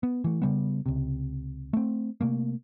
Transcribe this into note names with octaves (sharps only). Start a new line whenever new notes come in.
B3
E3 A3
C#3 G3 B3
C#2 C3
A3 C4
C3 A3 A#3